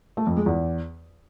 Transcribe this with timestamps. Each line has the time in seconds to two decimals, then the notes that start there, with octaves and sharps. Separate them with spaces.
0.17 A3
0.27 F2
0.37 G#3
0.46 E2